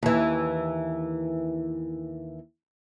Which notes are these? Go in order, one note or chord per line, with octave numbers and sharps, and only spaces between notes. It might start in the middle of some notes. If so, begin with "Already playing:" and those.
D#2 E3